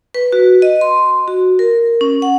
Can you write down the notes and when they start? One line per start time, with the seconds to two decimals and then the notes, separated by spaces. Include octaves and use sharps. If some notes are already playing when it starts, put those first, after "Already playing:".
0.14 B4
0.33 F#4
0.62 D#5
0.81 C6
1.28 F#4
1.59 A#4
2.01 C#4
2.22 F#5